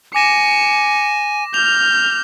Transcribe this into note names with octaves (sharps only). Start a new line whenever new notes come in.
G#5 D6 A#6 C#7 E7
F6 G6 F7